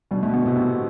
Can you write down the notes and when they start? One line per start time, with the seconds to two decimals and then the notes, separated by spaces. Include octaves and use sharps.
0.11 B2 D3 G3
0.22 B2 D3 A3
0.33 B2 D3 B3
0.45 A2 C3 B3